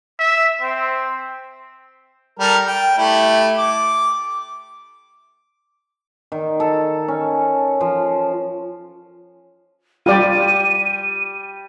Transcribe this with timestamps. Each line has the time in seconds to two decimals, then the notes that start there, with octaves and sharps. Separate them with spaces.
0.19 E5
0.62 C4
2.40 G3 A4 A#4
2.66 G5
2.98 A3 E4 G4
3.58 D6
6.32 D#3
6.60 A4
7.08 C#4
7.81 F3
10.06 G3 F4 G4 D5 D#7